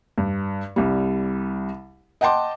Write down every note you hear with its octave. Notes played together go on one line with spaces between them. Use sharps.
G2
C2 G3
D#5 F#5 G5 A5 C6 D6